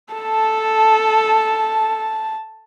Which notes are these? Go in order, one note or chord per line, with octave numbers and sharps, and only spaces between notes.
A4 A5